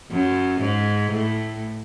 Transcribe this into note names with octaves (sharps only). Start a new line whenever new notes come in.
F#2
G#2
A2